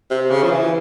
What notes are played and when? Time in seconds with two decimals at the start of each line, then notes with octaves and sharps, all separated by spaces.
0.11 C3
0.31 C#3
0.43 F3
0.50 E3